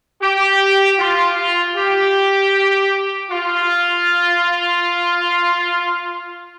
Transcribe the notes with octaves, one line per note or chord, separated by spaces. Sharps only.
G4
F4
G4
F4